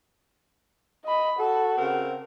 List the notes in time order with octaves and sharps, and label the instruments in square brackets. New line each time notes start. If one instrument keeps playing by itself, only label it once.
[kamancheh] D#5 B5
[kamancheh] F#4 [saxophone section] A4
[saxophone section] C#3 C4 A#4